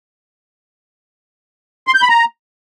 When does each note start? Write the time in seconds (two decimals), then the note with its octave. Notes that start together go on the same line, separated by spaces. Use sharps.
1.87 C6
1.95 G6
2.02 B5
2.09 A#5